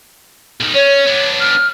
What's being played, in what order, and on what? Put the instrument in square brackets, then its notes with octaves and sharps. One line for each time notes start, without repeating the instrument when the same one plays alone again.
[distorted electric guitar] B1 D#3
[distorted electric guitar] C#4 [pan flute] C#5
[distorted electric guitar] B3 D4
[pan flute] F6